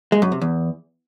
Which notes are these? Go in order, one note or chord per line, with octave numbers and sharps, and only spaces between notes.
G#3
F#2
C3
E2